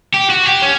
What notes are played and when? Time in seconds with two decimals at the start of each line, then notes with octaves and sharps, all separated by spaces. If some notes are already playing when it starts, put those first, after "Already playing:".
0.14 G4
0.30 F#4
0.46 G4
0.62 C#4